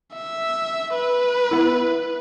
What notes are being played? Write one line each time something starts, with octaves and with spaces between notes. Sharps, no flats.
E5
B4
B3 E4